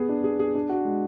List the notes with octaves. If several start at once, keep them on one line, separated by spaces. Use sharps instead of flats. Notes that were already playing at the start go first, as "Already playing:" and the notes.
Already playing: B3 G#4
D4
G#4
G#4
D4
F#4
G#3